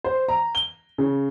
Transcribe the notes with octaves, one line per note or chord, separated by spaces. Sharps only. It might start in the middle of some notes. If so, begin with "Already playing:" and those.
C5
A#5
G7
C#3